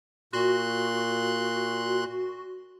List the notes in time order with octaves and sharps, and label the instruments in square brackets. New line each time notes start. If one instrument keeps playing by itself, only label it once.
[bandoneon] A#2 C6 F#6 [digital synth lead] F#4